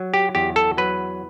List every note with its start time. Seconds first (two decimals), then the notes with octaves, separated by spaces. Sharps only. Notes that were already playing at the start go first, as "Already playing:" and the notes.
Already playing: F#3
0.14 G4
0.35 E2 G4
0.56 A4
0.78 F#3 B4